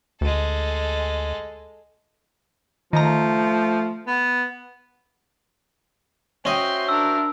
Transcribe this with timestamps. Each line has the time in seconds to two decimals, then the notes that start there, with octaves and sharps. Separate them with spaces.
0.21 D2 G#3 A4
2.93 D#3 F3 A3 A#5
4.07 B3
6.45 C#4 F#4 C5 D#5 E5 G5 C6
6.89 D4 A#4 E6